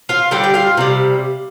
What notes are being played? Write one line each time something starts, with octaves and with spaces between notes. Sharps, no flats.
F4 F5
D3 G3 G4 G5
G5
F4 F5
C3 D#3 G3